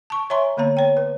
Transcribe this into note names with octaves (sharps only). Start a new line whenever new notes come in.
A5 C#6
C#5 E5 G#5 A#5 C6 C#6
D3 A#3 B3 C#5 A#5
C#5 G5
B4